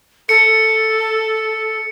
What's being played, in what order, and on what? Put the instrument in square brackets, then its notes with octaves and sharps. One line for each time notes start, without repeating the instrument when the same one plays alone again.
[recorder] A4 [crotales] C#7